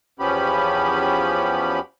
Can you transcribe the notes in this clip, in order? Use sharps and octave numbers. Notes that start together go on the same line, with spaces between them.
E2 F3 B3 C#4 G4 B5